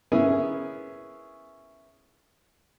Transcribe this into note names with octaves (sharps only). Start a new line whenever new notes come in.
A#3 B3 C#4 E4 G#4